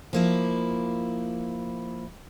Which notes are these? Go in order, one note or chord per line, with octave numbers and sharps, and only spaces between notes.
F3 A#3 E4